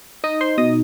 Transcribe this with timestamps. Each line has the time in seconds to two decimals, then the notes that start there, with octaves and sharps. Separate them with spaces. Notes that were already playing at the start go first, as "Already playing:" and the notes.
0.24 D#4 D#5 D#6
0.41 C5 C6
0.58 B2 D#5 D#6